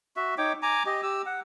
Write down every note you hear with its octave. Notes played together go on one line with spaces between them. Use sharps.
F#4 E5
D#4 C#5 G5 D6
G#5 A#5 D6
G4 D#5
G4 E6
F#5